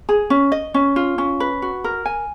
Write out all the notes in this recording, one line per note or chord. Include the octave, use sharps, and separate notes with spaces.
G#4
C#4
D#5
C#4
F4
C#4
B4
F#4
A#4
G#5